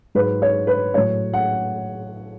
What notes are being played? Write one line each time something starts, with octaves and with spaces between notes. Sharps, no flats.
G#2 F#3 B4
C#5
B4
A2 F#3 C#5
F#5